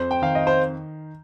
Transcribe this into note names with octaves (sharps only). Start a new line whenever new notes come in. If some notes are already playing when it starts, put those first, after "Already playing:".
Already playing: F2 C5
G5
D#3 F5
D#5
C5